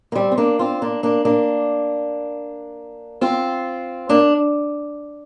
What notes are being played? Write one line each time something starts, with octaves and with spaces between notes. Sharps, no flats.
A#3
G3 C4
C4
A#3 D4
C4 F4
A#3 D4
A#3 D4
A#3 D4
C4 F4
A#3 D4